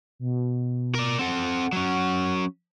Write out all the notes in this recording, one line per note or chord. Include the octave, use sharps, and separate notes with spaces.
B2
A#4 D5
C4 A4 F#5
F#3 C#4